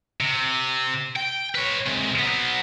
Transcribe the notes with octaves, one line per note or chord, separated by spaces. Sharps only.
C3
G5
B4 C#5
C3 G#3
F#3 B3